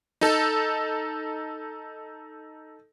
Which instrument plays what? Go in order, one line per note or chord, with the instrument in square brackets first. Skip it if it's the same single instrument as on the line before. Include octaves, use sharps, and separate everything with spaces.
[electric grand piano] D#4 A4